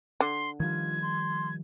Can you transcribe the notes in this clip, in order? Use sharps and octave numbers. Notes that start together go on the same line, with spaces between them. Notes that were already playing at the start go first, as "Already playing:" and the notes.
D3 C6
D#3 F3 G3 F4 G#6
C6